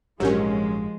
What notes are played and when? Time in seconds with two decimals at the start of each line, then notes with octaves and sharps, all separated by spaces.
0.20 A#1 G#2 F3 F#3 G#3 C#4 G4 A#4